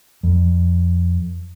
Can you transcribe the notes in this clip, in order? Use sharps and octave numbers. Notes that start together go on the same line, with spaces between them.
F2